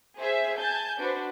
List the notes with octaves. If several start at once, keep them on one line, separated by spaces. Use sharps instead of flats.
G#4 C5 E5 G#5
G#5 A5 G6
D4 F#4 B4 C5